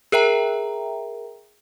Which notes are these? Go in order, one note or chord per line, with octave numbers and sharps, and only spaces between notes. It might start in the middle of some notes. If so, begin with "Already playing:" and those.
G#4 A#4 E5 G5 A#5